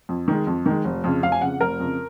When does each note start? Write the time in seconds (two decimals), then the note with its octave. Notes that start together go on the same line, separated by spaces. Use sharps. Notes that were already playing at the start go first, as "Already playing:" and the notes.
0.09 F2
0.28 D#3 G#3
0.47 F2
0.66 D#3 G#3
0.85 F1
1.04 F2 C#3
1.23 F1 F5
1.32 G#5
1.41 F2 C#3 F#5
1.61 F1 A#4
1.80 F2 C#3